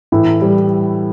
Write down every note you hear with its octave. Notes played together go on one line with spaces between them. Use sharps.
A2 E3 E4
G3